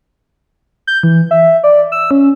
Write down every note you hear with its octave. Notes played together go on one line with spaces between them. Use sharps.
G6
E3
E5
D5
E6
C#4